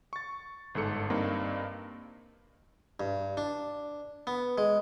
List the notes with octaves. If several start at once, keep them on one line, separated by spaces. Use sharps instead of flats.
C#6 A6
G1 G#2 A4 C#7
G2 A#3 C4 D#4
G2
D4
B3
G#3